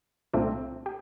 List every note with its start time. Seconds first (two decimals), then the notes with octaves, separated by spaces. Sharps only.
0.34 C2 A#2 A3 C4 D4 F4
0.86 G4